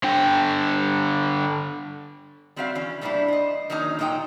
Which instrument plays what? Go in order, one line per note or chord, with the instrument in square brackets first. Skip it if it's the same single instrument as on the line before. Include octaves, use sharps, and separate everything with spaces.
[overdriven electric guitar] D3 G4
[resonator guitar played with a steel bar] G3 C4 C#4 F#4 E5 F5
E3 C#4
A2 G3 A#3 C#4 D4 E4
C5 D#5
D#3 F#3 A#3 C#4 D#4 G#5
A#2 F#3 D#4 D#5 G5